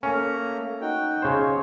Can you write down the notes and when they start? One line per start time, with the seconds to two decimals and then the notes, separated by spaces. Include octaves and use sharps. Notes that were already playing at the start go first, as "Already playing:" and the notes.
0.03 A3 A#3 C#4 A#5
0.81 D#4 F#4 G5
1.22 C#3 C5 C#5